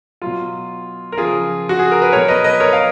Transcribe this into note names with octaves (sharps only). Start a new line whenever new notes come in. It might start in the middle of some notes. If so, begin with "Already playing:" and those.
B2 F#3 F4
A#4
C#3 F3 F4 G#4
F#4
G#4
A#4
B4
B2 F#3 A#4 C#5
B4 D#5
B4 D#5
A#4 C#5
F5